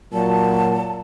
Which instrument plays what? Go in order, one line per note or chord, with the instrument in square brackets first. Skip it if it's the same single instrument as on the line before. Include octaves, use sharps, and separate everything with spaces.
[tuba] A#2 [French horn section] F#3 [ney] A5